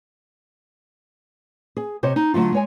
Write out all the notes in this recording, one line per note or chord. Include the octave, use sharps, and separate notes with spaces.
G#4
C3 C5 C#5 D#5
D#4
D3 F#3 A3 F4
G#3 C#5 G#5